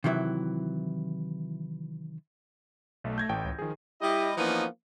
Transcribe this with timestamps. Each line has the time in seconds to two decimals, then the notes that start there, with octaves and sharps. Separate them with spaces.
0.04 C3 D#3 E3 F#3 E4
3.04 B1 A3
3.18 G6 G#6 A#6
3.29 A1 A2 G5
3.45 C#2
3.59 D#3 F3 G#4
4.01 G3 E4 G4 D#5
4.37 E3 F3 A#3 B3 C#4 D#4